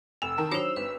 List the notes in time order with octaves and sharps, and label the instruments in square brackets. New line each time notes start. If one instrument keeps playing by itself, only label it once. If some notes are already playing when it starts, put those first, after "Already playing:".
[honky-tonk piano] F1 [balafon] G#5 [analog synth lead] E6
[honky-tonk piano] D#3 A#4 A5
[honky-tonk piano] F#3 F7 [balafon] D4 F#4 C#5 [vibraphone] D#4 C5
[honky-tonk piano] G#1 [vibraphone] B4